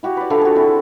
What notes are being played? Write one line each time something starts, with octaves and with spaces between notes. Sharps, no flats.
E4 F#4 G4 F5
B4 D5
D3 F3 E4 F5
F#4 G#4
C4 E4